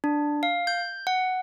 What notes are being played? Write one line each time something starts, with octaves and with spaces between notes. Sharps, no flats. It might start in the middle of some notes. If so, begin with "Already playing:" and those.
D4
F5
G6
F#5